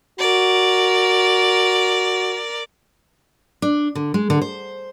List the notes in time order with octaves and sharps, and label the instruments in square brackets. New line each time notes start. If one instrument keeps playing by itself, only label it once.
[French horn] F#4 [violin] A#4 D5
[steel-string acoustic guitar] D4
D3
G#3
D3
C5